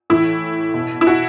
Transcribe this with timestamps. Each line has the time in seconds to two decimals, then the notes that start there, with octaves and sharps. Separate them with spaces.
0.10 A2 E3 E4
0.74 B2
1.01 E4
1.07 F#4